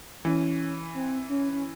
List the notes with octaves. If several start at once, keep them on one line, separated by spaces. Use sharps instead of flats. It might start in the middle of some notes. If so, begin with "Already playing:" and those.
E3 C#4
C4
C#4
C#4